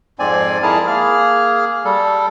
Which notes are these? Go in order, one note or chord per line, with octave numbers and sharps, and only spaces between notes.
F2 G#2 C4 D5 G#5
F2 E4 G#4 A#4 A5 F6
A#3 G#4 F6
G3 A4